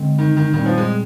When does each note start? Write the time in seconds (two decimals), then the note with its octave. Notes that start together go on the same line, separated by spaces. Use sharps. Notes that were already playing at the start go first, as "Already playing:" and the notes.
Already playing: D3 G#3 C4
0.19 D#3
0.37 D#3
0.54 A#2 D#3 G3 C4
0.66 F3
0.78 G#3